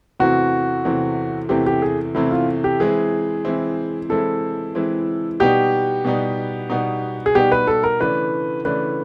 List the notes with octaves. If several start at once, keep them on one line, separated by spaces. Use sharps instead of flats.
E2 C3 E3 A3 C4 F#4
E2 C3 E3 A3 C4
E2 C3 E3 A3 C4 G4
G4
G#4
E2 C3 E3 A3 C4 E4
F4
G4
E3 G#3 C4 E4 G#4
E3 G#3 C4 E4
E3 G#3 C4 E4 A4
E3 G#3 C4 E4
B2 G3 B3 D#4 G4
B2 G3 B3 D#4
B2 G3 B3 D#4
G#4
B2 G3 B3 D#4 G4
B4
A4
A#4
C#3 E3 A3 D4 B4
C#3 E3 A3 D4 B4